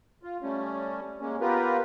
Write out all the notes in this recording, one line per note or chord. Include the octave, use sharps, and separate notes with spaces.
F4
G3 A3 C#4
G#3 A#3 C#4
B3 F4 G4 A#4 B4